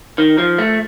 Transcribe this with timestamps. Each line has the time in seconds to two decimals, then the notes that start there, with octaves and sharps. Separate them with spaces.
0.18 D#3
0.38 F3
0.58 A3